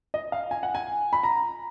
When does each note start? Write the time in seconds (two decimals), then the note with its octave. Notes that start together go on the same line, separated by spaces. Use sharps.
0.14 D#5
0.32 F5
0.51 G#5
0.63 F#5
0.75 G#5
1.13 B5
1.23 A#5